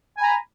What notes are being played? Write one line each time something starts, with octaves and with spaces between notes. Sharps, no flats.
G#5 A#5 B5